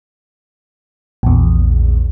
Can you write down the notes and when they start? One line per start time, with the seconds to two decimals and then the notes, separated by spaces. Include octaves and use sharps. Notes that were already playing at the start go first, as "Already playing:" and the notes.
1.23 A#1 E2